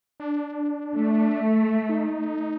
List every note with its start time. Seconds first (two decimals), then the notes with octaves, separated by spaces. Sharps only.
0.20 D4
0.97 A3
1.89 D#4